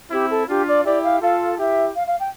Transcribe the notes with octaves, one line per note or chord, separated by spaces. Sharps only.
C4 E4 G4
A4
D4 F4 G4
D5
E4 G4 D5
F5
F4 A4 F5
E4 G4 E5
F5
F5
G5